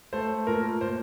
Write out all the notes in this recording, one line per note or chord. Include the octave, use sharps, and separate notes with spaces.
A3 C5
A#2 A#4
A#2 C5